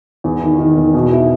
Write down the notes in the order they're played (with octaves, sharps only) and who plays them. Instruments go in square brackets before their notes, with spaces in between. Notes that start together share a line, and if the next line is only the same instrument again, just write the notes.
[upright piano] E2
D#3
D#3
E2
B2
E4